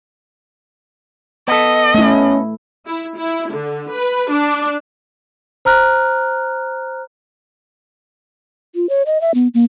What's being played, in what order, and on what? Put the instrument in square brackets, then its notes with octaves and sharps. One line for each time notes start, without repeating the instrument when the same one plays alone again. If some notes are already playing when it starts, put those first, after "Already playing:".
[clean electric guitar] B3 A4 [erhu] D#5
[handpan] A3 E4 [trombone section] C#4
[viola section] E4
E4
D3
B4
D4
[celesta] C5 A#5 F6 F#6
[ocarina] F4
C#5
D#5
E5
B3
A#3